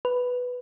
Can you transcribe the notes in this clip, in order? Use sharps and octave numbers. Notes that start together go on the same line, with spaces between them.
B4